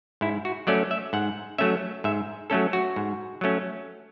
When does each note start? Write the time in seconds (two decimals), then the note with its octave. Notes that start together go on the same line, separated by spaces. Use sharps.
0.21 G#2 E4
0.45 F#4
0.67 F#3 A3 C#4 D5
0.91 E5
1.13 G#2 F#5
1.58 F#3 A3 C#4 E5
2.04 G#2 E5
2.50 F#3 A3 C#4 A4
2.73 F#4
2.96 G#2
3.41 F#3 A3 C#4